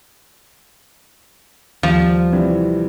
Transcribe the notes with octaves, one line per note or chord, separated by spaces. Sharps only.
D#2 F3 G3
C3 E3 G3